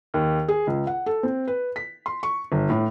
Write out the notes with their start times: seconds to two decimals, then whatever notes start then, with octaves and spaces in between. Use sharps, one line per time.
0.14 D#2
0.48 G#4
0.67 C#2
0.87 F#5
1.06 A4
1.23 C4
1.48 B4
1.76 B6
2.06 C6
2.23 C#6
2.52 G1
2.70 A2